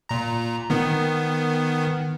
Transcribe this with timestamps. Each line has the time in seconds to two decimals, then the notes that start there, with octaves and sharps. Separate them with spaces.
0.09 A#2 A#5
0.70 D#3 B3